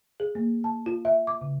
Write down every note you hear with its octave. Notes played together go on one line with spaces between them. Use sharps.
G#4
A#3
A5
F4
E5
D6
C#3